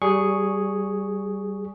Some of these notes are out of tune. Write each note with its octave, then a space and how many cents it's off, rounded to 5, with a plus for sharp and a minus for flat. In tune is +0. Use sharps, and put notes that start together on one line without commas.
G3 -20 G#4 +0 C#6 +0